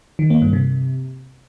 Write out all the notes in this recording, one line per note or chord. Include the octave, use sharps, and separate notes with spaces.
D#3
A#3
G2
C3